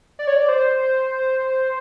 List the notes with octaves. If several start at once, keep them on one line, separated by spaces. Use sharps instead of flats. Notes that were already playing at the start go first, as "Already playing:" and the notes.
D5
C#5
D5
C5